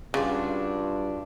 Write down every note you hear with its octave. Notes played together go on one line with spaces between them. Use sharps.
G2 C#3 D4 F4 F#4